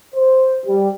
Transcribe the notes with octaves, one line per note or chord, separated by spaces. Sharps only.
C5
G3